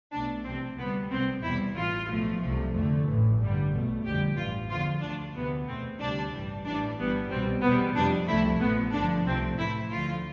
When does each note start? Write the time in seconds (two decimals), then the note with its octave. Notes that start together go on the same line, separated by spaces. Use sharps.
0.12 B1 B2 A3 D4
0.45 C2 C3 E3 C4
0.78 D2 C3 G3 B3
1.10 C2 C3 G3 C4
1.43 E2 B2 G3 E4
1.75 A1 A2 E3 F4
2.09 B1 A2 F3 A3
2.41 C2 C3 F3 A3
2.74 F2 D3 A3
3.06 A1 A2 E3
3.38 G2 D3 G3
3.72 B1 B2 A3
4.04 F2 D3 G3 G4
4.36 A1 G2 E3 F4
4.69 E2 D3 F3 A3 F4
5.01 D2 D3 A3 D4
5.34 D2 C3 E3 B3
5.66 E2 B2 A3 C4
5.99 D2 C3 G3 D4
6.32 A1 G2 E3 G3
6.64 A1 A2 E3 G3 D4
6.97 G1 G2 E3 G3 B3
7.30 C2 B2 G3 C4
7.62 E2 B2 G3 B3
7.94 F2 C3 G3 D4
8.27 C2 C3 F3 A3 E4
8.60 A1 A2 F3 A3 B3
8.92 G1 G2 D3 F3 D4
9.25 C2 C3 F3 A3 C4
9.58 A1 A2 E3 A3 E4
9.90 D2 D3 F3 A3 F4